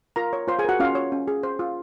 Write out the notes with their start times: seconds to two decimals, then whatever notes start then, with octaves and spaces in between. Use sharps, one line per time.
0.16 F4 A#4 A#5
0.33 C#5
0.48 F4 C5 C6
0.59 G#4 G#5
0.65 F#4 A#4 F#5
0.80 C#4 F4 F5
0.95 C#5
1.12 C#4
1.28 G#4
1.43 C5
1.59 F4